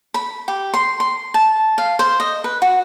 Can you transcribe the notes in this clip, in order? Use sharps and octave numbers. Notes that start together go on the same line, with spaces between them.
B5
G4
C6
C6
A5
F5
C5
D#5
B4
F#4